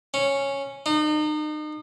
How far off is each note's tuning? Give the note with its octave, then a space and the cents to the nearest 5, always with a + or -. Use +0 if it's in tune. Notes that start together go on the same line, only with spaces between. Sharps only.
C#4 -5
D#4 -35